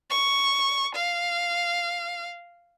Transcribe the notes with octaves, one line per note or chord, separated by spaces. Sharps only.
C#6
F5